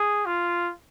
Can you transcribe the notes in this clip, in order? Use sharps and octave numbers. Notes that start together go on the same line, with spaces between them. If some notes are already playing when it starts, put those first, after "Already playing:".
Already playing: G#4
F4